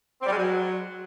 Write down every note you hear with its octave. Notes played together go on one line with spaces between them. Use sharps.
C4
G3
G#3
F#3